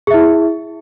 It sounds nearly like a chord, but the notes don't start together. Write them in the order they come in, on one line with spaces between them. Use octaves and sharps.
G#4 E5 E4